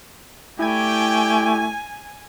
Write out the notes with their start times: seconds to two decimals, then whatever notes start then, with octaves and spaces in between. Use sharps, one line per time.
0.59 A3 E4 G4 D5 G5 G#5 G#6